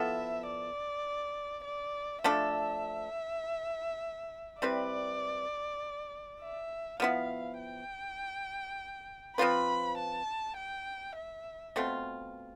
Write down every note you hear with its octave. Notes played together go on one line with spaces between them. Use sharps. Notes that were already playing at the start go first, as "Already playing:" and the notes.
Already playing: F3 B3 E4 A4 E5
D5
D5
F3 A3 D4 A4 E5
G3 C4 E4 B4 D5
E5
F3 B3 E4 F5
G5
F3 C4 F4 B4 B5
A5
G5
E5
B2 A3 C4 F4